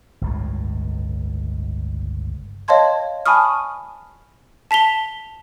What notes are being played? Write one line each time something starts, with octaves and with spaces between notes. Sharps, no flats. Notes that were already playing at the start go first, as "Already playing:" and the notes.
G1 C#2 A2
C#5 D#5 F5 A5 C6 G#6
G#5 A5 B5 C#6 D#6 F6
A5 B6 F7 G7